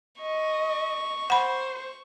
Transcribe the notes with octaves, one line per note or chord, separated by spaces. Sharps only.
D#5 C#6
C5 F#5 B5